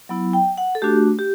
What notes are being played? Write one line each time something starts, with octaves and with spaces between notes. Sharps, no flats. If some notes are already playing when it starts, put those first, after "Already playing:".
F#3 B3 E4
G5
F#5
A4
A3 D4 F#4 G4
G4